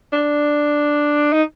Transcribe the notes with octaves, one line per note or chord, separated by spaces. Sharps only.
D4
D#4